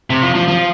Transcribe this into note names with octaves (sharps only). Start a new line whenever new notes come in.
C3
F3
F3
F3